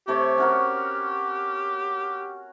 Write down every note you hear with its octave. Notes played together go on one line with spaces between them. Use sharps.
C3 A3 G4 C#5
C#4 F#4 A#4